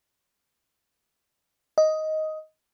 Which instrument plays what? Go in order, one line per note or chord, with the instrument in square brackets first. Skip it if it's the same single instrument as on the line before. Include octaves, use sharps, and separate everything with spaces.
[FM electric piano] D#5